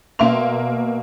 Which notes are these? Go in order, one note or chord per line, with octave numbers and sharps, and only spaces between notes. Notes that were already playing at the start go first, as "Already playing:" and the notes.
B2 A#3 A#4 E5 C6 F7